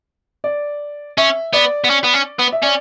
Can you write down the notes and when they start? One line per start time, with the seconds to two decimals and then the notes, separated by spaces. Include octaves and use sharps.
0.44 D5
1.17 C#4 E5
1.53 B3 D5
1.84 B3
1.90 C#4
2.04 B3
2.14 C#4
2.39 B3
2.52 E5
2.63 C#4 D5